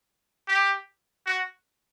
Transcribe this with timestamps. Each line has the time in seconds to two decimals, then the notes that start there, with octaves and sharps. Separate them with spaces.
0.48 G4
1.26 F#4